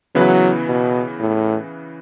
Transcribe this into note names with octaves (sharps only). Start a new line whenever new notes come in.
C#3 E3 F#3 B3 E4 B4
B2
A2